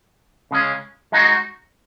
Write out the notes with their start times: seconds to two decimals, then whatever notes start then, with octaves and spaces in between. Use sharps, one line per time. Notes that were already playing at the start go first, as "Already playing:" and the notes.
0.51 C#3 G#3 C#4
1.12 G#3 D#4 F#4